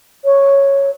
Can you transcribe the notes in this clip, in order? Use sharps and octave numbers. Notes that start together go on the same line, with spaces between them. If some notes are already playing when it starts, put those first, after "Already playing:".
C#5